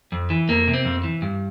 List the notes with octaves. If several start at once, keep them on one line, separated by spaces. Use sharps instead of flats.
F2
E3
F2 A#3
C3
C4
F2
E3
G2